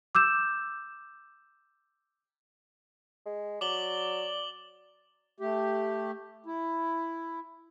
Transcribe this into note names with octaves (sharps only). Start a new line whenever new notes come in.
D6 E6 G6 E7
G#3
F#3 D5 D6 F#7 G7
A3 G4
E4